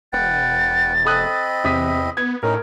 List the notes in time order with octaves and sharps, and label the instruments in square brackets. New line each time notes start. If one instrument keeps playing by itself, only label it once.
[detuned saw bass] E1 [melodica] B4 F#5 G5 [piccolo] A6
[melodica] C4 D#5 B5 [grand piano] A4 D#6 F#6
[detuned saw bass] E2 [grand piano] C3 D#6 B6
[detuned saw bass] B3 [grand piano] G#6
[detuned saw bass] A2 [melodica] C#4 D#4 [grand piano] A#4